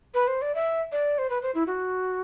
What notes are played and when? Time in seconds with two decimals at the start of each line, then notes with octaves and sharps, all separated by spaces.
0.14 B4
0.27 C5
0.42 D5
0.55 E5
0.92 D5
1.18 C5
1.30 B4
1.42 C5
1.55 E4
1.67 F#4